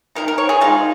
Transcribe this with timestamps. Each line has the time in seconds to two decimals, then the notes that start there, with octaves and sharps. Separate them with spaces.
0.15 D#3 G#3 D#4 A#4
0.28 A#4
0.38 C#5
0.49 G#4
0.61 D#3 G#3 D#4 F4